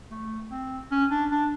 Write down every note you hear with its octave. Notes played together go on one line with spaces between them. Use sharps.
A3
C4
C#4
D4
D4